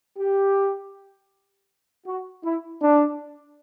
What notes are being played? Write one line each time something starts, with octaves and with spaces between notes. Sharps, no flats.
G4
F#4
E4
D4